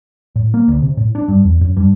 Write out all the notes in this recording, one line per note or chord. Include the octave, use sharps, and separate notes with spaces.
A2
A#3
D2
C3
A2
D4
G2
E2
F#2
G2